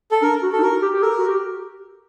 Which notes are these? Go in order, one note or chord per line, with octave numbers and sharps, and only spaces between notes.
A4
D4 A#4
F#4
A4
D#4
F#4 A#4
G4
G4
A4 A#4
F#4
G4